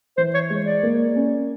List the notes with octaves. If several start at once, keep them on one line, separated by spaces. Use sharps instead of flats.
E3 C5
C#5
G#3
D5
A#3
C#4